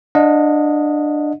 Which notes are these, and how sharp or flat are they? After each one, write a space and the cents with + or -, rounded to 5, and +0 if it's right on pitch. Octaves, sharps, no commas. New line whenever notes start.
D4 +15 D#5 +0 F#5 -40